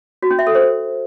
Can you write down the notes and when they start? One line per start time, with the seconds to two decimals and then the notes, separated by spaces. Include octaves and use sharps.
0.22 F#4
0.31 C#4
0.39 E5
0.47 A4
0.55 C5